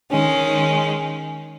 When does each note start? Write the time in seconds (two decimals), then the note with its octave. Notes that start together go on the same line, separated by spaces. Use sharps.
0.11 D#3 G#3 C#4